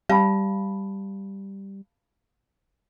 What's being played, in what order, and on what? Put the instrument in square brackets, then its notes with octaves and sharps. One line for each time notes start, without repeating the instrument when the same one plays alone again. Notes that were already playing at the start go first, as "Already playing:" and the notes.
[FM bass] G3 [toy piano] F5 A5 B5